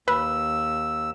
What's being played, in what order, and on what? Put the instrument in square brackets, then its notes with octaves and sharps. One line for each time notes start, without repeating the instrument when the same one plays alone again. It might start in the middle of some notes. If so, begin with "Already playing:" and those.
[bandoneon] D#2 E6 [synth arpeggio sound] B4